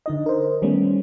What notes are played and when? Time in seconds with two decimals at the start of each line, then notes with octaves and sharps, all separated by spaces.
0.06 D3 D#4 D#5
0.26 A#4 C5
0.62 D#3 G3 A3 B3 C#4